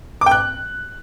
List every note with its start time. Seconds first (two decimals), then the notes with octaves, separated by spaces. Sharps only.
0.21 D6
0.26 G5
0.31 F#6